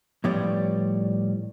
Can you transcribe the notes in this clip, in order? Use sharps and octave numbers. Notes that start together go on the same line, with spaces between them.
A2 F3 G3 B3 C#5 D5